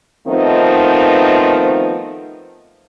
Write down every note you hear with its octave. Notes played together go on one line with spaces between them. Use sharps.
D#3 F3 A3 B3 C4 D#4